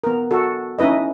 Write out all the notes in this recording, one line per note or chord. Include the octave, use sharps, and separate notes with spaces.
B3 A#4
F#4 A4
C#4 D#4 E4 B4 D#5